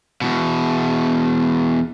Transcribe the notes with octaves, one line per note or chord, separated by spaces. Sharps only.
E2 B2